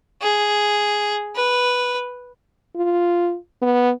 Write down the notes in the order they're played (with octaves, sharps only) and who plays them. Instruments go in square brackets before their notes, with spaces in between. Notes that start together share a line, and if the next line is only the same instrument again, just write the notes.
[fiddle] G#4
B4
[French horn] F4
B3